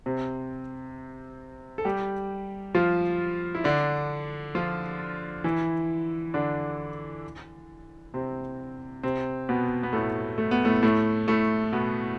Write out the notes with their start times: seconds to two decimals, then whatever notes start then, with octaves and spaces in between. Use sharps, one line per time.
0.06 C3 C4
1.78 A4
1.85 G3 G4
2.75 F3 F4
3.55 E4
3.64 D3 D4
4.55 F3 F4
5.44 E3 E4
6.34 D3 D4
8.14 C3 C4
9.03 C3 C4
9.49 B2 B3
9.83 B3
9.93 A2 A3
10.38 A3
10.51 B3
10.65 A2 A3
10.83 A2 A3
11.28 A2 A3
11.72 B2 B3